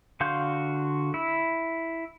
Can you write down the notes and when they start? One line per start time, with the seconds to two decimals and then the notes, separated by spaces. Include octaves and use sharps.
0.20 D3 F#4 F5 C6 G6
1.14 E4